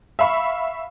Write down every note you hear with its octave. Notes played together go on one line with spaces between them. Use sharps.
E5 F5 B5 C#6